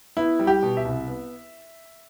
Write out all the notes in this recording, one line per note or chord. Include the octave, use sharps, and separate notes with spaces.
B3 E4
G3
G4
B2
E5
C2
B3